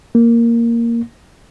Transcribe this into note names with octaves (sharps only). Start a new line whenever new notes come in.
A#3